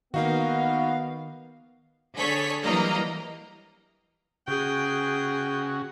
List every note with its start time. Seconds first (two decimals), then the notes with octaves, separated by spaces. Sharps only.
0.14 D#3 A#3 B3 D#4 F#4 F5
2.17 D3 G#4 A4 C#5 B6
2.63 E3 F#3 G3 A#3 D#5 A#5
4.47 C#3 F#4 G#4 G5